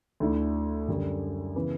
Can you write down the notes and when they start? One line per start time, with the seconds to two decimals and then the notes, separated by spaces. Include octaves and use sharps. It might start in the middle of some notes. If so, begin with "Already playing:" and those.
0.20 D2 D3 A3 E4
0.88 F#2 D3 G3
1.55 C#3 E3 B3